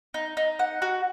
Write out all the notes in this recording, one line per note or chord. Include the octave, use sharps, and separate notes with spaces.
D#4
D#4
F#5
F#4